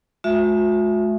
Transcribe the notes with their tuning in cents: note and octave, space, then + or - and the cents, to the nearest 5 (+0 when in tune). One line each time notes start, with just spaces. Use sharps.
G#3 +40 F#4 -45 E5 +10